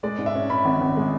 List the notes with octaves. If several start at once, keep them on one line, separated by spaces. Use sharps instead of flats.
G#3 D5
G#2
E5
C#4
C#4 B5
G#1
G#1
G#3